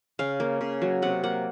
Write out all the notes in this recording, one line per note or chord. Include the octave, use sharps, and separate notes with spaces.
C#3 F5
A#3
C#3
F#3
C3 F#5
A#3 F#5